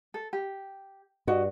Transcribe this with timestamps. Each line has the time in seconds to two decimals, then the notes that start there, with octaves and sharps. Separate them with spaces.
0.14 A4
0.33 G4
1.27 G2 F#4 D#5